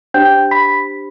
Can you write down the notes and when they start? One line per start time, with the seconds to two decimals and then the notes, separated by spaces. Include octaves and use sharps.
0.14 D4 G4 C5 G5 G6
0.51 B5 B6